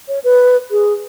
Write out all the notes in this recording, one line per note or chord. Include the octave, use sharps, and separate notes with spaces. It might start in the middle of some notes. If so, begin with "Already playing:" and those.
C#5
B4
G#4